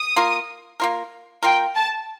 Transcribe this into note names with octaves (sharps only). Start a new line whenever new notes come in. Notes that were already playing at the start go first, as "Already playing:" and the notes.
Already playing: D#6
A#3 F4 A#4
A#3 F4 A#4
A#3 F4 A#4 G5
A5